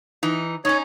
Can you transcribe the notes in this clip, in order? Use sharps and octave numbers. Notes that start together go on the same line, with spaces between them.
E3 D#4
C#4 D#4 C#5